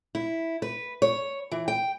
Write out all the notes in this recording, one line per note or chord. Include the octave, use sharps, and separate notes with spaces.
E4
B4
C#5
E3
G5